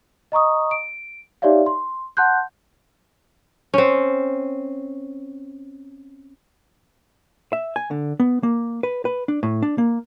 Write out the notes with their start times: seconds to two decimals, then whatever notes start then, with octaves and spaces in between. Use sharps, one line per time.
0.32 D#5 A#5 C#6 D#6
0.71 D7
1.42 D#4 G4 C#5 D5 E5 F5
1.66 C6
2.17 F#5 A5 C6 F#6 G6
3.74 C4 C#4
7.53 E5
7.76 G#5
7.91 D3
8.20 B3
8.43 A#3
8.83 B4
9.05 B4
9.28 D4
9.43 A2
9.62 D4
9.78 A#3